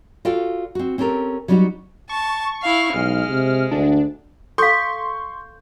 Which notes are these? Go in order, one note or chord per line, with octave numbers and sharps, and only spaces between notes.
F4 F#4 A4 D5 F5 G5
C4 F#4
C4 C#4 G4 A4 A#4
F#3 G3 B3 C#4 D#4 F#4
A5 C#6
E4 F5
B1 G#3 F6
C3
D2 D4
A4 F5 C6 C#6 G6